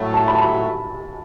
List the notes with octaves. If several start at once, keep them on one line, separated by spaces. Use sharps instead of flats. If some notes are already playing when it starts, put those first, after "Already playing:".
Already playing: A2 F#3 A3
A5
B5
A5
B5